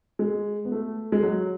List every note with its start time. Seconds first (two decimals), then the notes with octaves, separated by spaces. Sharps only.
0.19 G#3
0.65 B3
0.72 A3
1.12 G#3
1.23 F#3